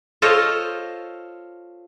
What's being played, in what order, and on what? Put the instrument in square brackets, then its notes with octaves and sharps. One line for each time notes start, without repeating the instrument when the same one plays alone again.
[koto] F4 A4 C5 C#5 D#5